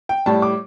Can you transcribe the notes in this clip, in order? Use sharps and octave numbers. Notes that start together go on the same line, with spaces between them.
G5
A2 G3 A5
D6